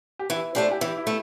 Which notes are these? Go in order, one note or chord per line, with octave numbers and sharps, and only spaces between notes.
G4
E3 E4
A3 D4 G4 C5
G4
E3 E4
E4
A3